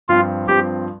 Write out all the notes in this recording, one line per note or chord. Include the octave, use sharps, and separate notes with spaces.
G2 F3 C4 F4
G2 F3 C4 G4